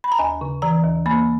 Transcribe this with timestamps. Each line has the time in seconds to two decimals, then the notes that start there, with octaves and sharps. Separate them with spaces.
0.04 B5
0.12 A#5
0.18 D#2 G#5
0.41 C#3
0.62 E3 A#5
0.84 D#2
1.06 A#3 B5